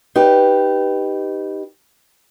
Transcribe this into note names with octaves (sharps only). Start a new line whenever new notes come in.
D#4 G4 B4